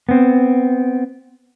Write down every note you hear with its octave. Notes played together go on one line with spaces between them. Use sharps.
B3 C4